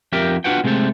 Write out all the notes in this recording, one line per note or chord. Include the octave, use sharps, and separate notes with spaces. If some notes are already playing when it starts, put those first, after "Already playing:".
F2 G4 A#4 E5 G5
D4 F4 F#4 B4 F#5 G5
C3 G#3 A3 C4 A4